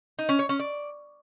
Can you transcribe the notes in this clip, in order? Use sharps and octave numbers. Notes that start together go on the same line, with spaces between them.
D#4
C#4
C#5
C#4
D5